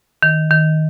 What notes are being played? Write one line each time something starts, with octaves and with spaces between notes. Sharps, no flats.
D#3
D#3